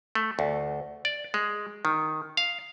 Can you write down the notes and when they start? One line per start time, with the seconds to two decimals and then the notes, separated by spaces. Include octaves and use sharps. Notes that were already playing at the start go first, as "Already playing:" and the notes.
0.15 A3
0.39 D2
1.05 D5
1.34 G#3
1.85 D#3
2.37 F5